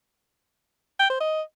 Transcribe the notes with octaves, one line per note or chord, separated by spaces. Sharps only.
G5
C5
D#5